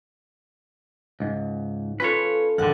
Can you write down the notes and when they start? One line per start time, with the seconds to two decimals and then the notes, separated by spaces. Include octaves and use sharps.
1.20 C#2 G#2
2.00 C#4 F4 A4 B4 C#5
2.58 G#1 F2 D3 F#5 F#6